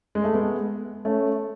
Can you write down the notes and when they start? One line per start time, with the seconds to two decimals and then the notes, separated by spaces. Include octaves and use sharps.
0.15 G#3
0.24 A3
0.34 G#3 B3
1.05 A3 C#4